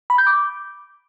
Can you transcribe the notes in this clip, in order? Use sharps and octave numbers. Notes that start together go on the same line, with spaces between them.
B5
G6
D6